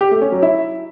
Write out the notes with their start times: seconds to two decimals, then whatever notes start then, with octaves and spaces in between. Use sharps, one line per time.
0.01 G4
0.11 A3
0.22 C#4
0.32 F#3
0.42 E4